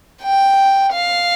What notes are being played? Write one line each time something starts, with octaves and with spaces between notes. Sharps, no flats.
G5
F5